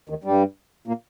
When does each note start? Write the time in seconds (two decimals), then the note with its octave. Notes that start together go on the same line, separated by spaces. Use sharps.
0.09 D#2 D#3
0.24 G2 G3
0.87 A#2 A#3